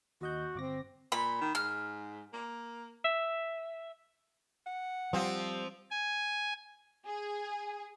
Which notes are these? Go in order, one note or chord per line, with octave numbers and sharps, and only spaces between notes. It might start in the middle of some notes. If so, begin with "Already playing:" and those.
D#2 F#4 D#5 G6
G1 C4 D6 A#6
A#2 B5
D#3
G#2 F6
A#3
E5
F#5
F3 G3 C4
G#5
G#4